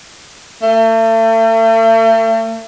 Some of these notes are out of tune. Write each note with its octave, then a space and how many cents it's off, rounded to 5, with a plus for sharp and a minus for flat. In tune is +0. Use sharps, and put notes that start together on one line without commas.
A3 +40